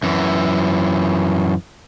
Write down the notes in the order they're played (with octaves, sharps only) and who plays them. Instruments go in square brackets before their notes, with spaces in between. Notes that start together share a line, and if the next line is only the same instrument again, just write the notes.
[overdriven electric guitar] F#2 E3